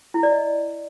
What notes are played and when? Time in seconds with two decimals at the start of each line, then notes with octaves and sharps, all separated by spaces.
0.14 E4
0.23 D5
0.32 D#5